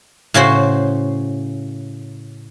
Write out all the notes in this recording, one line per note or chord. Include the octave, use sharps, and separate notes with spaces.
A2 C#3 F#4 C5